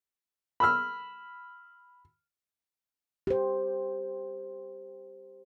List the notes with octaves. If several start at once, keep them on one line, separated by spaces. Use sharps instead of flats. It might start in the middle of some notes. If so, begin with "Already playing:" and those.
B5 E6 F6
G4 C5